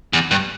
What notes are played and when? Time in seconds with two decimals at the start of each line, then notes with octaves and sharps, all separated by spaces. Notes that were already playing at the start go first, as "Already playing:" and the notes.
0.13 E2
0.31 G2